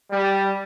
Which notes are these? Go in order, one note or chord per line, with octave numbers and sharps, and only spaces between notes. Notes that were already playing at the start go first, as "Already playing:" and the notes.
G3